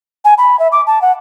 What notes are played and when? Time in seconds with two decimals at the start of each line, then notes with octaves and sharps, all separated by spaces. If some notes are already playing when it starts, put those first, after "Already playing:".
0.25 G#5
0.38 B5
0.59 E5
0.72 D6
0.87 A5
1.02 F#5